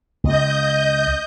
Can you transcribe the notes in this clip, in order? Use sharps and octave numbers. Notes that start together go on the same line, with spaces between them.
C#2 D#5 G6